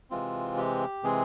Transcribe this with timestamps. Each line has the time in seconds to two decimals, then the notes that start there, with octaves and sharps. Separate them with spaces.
0.11 C3 E3 G#3 C4 F4
0.58 G4
1.03 C3 E3 G#3 C4 G#4